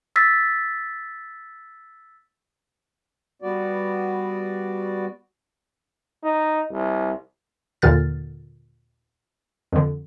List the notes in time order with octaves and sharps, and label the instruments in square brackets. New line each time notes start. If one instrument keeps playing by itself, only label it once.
[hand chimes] E6 A6 B6
[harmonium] G3 B3 F#4 D5
[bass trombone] D#4
C2
[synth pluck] D#2 A#2 D3 F6 A6
F2 D3